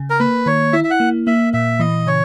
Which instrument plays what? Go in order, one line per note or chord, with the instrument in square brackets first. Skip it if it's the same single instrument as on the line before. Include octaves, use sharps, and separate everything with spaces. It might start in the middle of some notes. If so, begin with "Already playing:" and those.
Already playing: [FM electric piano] C#3
[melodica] A#4
[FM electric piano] A#3 [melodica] B4
[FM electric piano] D#3 [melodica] C#5
[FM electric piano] E4 [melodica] E5
[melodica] E5
F#5
[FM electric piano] A#3
[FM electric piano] A#3 [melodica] E5
[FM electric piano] A#2 [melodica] E5
[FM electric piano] E3 [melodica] D#5
[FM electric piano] C#3 [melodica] C#5